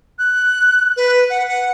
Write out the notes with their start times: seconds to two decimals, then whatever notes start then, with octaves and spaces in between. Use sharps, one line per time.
0.19 F#6
0.97 B4
1.30 F#5
1.48 F#5